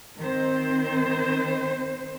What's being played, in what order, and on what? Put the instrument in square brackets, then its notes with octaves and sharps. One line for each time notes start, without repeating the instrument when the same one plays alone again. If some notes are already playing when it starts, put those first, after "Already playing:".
[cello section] D#3 C4 C5